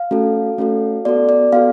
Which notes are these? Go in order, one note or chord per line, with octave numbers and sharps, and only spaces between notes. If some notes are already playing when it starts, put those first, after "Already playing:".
Already playing: F5
A3 C#4 F#4 A4
A3 C#4 F#4 A4
B3 F#4 A4 D5
D5
B3 F#4 A4 F5